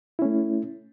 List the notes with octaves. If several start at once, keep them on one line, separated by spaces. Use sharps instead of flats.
A3 C#4 E4